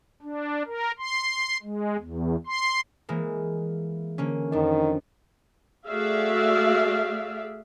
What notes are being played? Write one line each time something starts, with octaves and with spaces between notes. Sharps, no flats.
D4
A#4
C6
G#3
E2
C6
E3 G#3 A#3
D3 A#3 C#4
F2 D#3 D4
A3 F#4 G#4 D5 E5 F5